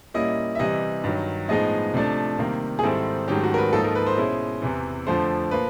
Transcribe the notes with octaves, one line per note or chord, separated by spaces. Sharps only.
A#2 G3 A#3 C#4 E4 D#5
E5
C3 E3 G3 D#5
G2 D#3 F#3
A2 F3 G#3 B3 D#4 D#5
C3 F3 A3 D4
C3 D#3 G3 A#3
G#4
G#2 D#3 G3 C4 E4 A4
G#2 D#3 F#3 A3 C#4 G4
F#4
A#4
B4
G#2 F3 A#3 D#4 A4
A#4
B4
C5
B2 G#3 C#4 E4
E2 C3 E3
F2 D3 F3 A3 C5
A#2 F3 A#3 B4